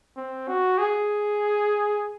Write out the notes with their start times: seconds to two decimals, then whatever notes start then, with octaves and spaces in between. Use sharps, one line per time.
0.16 C4
0.48 F#4
0.78 G#4